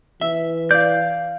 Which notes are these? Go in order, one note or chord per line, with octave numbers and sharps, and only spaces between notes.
E3 E5
D5 F5 G6